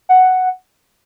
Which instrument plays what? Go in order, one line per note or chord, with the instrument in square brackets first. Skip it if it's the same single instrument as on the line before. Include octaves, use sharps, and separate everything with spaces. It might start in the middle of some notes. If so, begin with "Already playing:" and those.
[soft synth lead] F#5